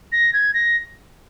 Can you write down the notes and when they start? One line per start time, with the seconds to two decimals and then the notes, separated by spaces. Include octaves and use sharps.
0.12 A#6
0.33 G#6
0.54 A#6